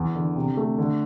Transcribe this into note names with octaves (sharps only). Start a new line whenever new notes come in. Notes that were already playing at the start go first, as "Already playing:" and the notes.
Already playing: E2
D3
C3
A3
D3